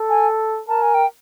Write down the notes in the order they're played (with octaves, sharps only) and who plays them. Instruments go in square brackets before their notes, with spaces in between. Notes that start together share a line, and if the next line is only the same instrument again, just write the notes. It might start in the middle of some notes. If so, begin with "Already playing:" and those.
Already playing: [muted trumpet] A4
[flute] G#5
[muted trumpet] A#4 [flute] A5
[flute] G#5
G5